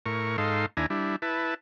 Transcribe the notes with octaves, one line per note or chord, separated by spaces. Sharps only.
A2 A#4 C#6
G#2 D#4 A4 F5 C6
D#2 D4 E4 G#5 A#5
G3 D4 E4
E4 B4 A5